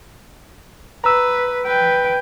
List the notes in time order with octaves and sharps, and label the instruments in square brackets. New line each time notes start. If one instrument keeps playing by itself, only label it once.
[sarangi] B4 [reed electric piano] A#5 E6
[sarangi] B4 [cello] G5